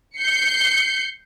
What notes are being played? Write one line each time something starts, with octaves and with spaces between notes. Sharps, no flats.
G6 C7 C#7